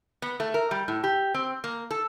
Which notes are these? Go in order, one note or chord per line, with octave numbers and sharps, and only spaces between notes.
B3
A3
A#4
G3
A2
G4
C4
A#3
A4